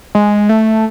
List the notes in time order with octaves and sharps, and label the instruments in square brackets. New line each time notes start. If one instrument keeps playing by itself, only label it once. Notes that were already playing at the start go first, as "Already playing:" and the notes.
[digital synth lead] G#3
A3